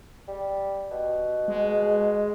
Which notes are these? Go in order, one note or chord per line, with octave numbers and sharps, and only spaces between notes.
G3
B2
G#3